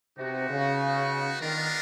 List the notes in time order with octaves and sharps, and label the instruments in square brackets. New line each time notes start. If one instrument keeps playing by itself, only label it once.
[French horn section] C3 [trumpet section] B3 D#4 F#4
[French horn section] C#3
[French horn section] D#3 [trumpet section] G#3 B3 D4 F4 A#4